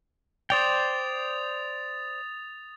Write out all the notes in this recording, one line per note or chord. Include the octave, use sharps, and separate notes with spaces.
C5 D5 G5 D#6 A6 F7